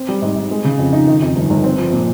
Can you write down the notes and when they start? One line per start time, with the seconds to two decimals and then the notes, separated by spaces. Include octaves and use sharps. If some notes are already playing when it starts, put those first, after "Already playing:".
Already playing: C4
0.09 G3
0.22 G#2
0.36 G#2
0.51 G#3
0.64 C#3
0.79 F2
0.93 D#4
1.07 D#3
1.22 F2
1.36 G1
1.50 G1
1.64 C4
1.78 F3
1.93 A#2